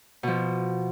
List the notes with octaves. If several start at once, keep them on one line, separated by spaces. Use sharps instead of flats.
B2 F3